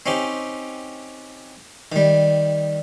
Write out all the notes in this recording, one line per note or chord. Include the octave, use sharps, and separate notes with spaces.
C4 C#4 D#4 G4
D#3 G3